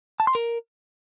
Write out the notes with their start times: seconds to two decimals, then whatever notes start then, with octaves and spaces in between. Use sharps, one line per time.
0.20 A5
0.27 C6
0.35 A#4